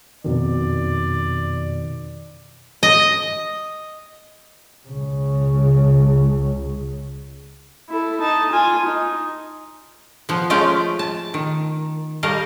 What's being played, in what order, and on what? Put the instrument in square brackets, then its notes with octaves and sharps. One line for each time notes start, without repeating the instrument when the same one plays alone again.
[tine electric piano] F2 B2 D#3 [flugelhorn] D5
[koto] D#5
[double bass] C#2 C#3
[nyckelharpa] E4 A4
D#4 A5
F4 G#5
D#4
[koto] F3 B3
G#3 A3 C#4 F4 F5 G5
A5
D#3
G3 A3 A#4 D#5 F5